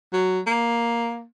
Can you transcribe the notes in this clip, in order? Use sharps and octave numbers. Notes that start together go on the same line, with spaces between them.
F#3
A#3